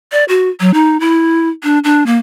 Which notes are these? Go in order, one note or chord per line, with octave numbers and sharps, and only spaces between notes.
D5
F#4
F#3
D#4
E4
D4
D4
A#3